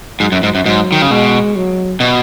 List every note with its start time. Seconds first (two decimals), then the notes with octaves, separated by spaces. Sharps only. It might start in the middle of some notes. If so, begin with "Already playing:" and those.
0.20 G#2 F#3
0.32 F#2
0.43 G#2
0.55 F#2
0.66 G#2 F#3
0.92 D#3
1.02 C#3
1.10 B2 G#3
1.56 F#3
2.00 B2